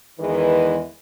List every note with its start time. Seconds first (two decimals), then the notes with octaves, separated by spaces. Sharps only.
0.20 E2 D#3 E3 G#3 G#4 B4